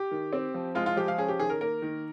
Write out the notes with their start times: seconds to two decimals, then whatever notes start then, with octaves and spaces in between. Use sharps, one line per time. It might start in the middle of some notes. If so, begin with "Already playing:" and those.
Already playing: G4
0.11 D#3
0.33 C4
0.54 F3
0.75 G#3 F4
0.86 F4
0.96 F3 G4
1.08 F5
1.18 C#4 G#4
1.28 G4
1.40 D#3 G#4
1.50 A#4
1.61 A#3 A#4
1.82 D#3